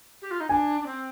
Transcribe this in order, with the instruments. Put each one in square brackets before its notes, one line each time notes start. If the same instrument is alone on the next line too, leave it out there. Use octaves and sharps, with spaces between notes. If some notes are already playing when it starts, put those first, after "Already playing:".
[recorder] G4
F4
D#4
[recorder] D4 [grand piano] G#5
[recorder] D4
C4